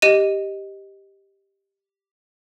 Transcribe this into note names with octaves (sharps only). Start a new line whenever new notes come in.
G4 D#5 D#7